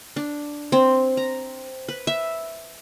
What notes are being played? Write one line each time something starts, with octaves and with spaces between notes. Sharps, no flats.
D4
C4
A#5
B4
E5